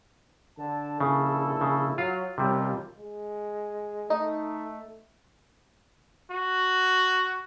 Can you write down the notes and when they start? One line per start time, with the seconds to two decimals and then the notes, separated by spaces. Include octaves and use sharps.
0.58 D3 A5
1.00 A#1 C#3 E4 A4
1.61 C#3
1.98 F#3 F4 F5
2.38 A1 D#2 C3 G3 F4
2.97 G#3
4.10 A3 D#4
6.31 F#4